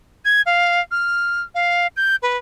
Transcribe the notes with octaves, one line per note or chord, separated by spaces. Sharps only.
G#6
F5
F6
F5
G6
B4